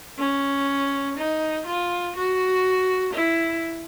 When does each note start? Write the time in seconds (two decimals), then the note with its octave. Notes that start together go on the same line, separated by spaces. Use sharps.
0.19 C#4
1.17 D#4
1.66 F4
2.16 F#4
3.13 E4